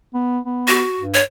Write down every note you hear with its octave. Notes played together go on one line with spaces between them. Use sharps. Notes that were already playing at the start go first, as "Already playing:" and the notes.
B3
B3
F#4
G2
C#5